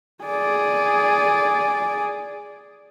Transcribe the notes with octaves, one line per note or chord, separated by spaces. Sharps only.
G#4 D5